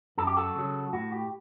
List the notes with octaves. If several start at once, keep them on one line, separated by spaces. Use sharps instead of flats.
F#2 A4
G4
F#4 A4
C#3 F#3
A2 F#4
G4